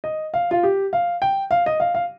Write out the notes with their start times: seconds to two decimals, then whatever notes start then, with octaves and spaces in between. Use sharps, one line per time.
0.04 D#5
0.34 F5
0.51 F4
0.63 G4
0.93 F5
1.22 G5
1.51 F5
1.66 D#5
1.80 F5
1.95 F5